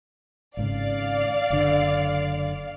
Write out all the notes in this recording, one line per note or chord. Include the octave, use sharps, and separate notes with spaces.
G#1 G#2 C#3 D5 F5
F#1 D3